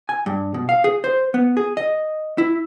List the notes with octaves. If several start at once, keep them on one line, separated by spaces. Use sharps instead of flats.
G#5
G2
B2
F5
G#4
C5
B3
G#4
D#5
E4